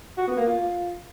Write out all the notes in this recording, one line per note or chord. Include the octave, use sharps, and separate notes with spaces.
F#4
B3
A#3
F4